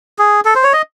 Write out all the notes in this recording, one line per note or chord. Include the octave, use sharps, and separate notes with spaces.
G#4
A4
C5
C#5
D#5